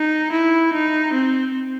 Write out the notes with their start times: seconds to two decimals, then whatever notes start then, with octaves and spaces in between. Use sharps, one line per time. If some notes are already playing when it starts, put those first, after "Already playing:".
Already playing: D#4
0.32 E4
0.73 D#4
1.13 C4